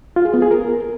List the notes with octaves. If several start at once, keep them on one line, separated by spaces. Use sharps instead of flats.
F4
G#4
B3
G#4
A#4